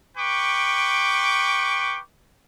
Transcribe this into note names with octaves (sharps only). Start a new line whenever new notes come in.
B4 G5 C#6 D6